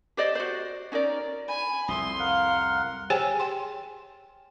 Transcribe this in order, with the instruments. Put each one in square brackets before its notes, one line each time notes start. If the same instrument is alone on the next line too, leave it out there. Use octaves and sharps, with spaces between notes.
[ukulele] G4 C5 D5 D#5
F#4 C5
C#4 D#4 A#4 D5
[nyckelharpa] G#5 [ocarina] B5
[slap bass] C2 F2 [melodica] E5 [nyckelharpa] C6 [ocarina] D#6
[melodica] A#4 F#5 [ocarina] F5
[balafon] G4 G#4 C5 C#5 G5 G#5
G5 C6